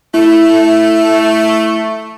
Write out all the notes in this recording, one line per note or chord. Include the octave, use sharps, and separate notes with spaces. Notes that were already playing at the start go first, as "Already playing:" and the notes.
A3 E4